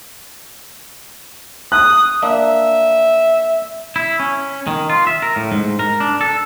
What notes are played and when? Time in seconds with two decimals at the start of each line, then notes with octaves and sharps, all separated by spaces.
1.72 D#6 F#6
2.23 A#3 D4 E5
3.96 E4
4.20 C#4
4.67 D#3
4.90 F4
5.07 E5
5.23 A#4
5.36 A2
5.52 G#2
5.79 A#4
6.00 D4
6.21 A4